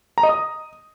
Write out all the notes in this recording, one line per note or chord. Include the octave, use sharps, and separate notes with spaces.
A#5
D#5
D#6